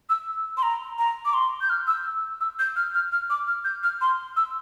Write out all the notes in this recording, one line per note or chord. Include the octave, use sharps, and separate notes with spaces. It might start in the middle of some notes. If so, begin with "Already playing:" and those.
E6
C6
A#5
A#5
D6
C6
G6
F6
E6
E6
G6
F6
F6
F6
D6
F6
G6
F6
C6
E6